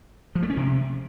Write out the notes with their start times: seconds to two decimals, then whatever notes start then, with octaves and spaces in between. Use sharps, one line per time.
0.35 F3
0.43 A3
0.50 C#4
0.57 C3